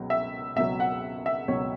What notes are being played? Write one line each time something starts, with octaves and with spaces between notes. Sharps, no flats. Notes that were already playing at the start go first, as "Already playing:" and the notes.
Already playing: C#2 B2 F#3
E5
C#2 B2 F#3 E5
F#5
E5
C#2 B2 F#3 C#5